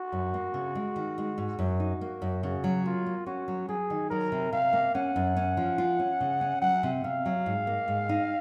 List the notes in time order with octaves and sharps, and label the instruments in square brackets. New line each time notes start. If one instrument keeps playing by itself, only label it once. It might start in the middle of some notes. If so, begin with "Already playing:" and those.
Already playing: [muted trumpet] F#4
[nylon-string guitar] F#2
A#3
C#3
G#3
D#3
G#3
G#2
F#2
D#4
A#3
F#2
[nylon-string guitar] C#3 [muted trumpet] F#4
[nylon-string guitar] F#3
[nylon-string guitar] A#3 [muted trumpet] F4
[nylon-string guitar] A#3
[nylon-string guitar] C#4 [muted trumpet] F#4
[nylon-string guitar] F#3
[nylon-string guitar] F#3 [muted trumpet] G#4
[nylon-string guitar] D#3
[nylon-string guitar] F#3 [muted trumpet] A#4
[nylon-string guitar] C3
[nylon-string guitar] C3 [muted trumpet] F5
[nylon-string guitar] A#3
[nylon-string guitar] C#4 [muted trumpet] F#5
[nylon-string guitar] F#2
C#4
F3
F4
C#4
C#3
C#4
[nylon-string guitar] F#3 [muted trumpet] F#5
[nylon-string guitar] C3
[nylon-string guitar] C3 [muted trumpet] F5
[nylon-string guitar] F#3
G#2
A#3
G#2
D#4